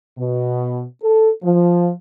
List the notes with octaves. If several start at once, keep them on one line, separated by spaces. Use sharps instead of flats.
B2
A4
F3